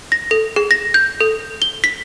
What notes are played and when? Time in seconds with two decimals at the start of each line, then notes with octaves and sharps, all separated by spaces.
0.12 A#6
0.31 A4
0.56 G#4
0.71 A#6
0.94 G6
1.20 A4
1.62 G7
1.84 B6